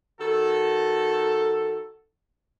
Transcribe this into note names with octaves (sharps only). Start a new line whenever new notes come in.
D#3 F#4 A4